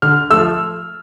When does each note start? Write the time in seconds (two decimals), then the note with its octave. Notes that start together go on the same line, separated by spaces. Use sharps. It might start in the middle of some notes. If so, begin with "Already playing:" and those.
0.02 D3 F6
0.30 F3 A3 E6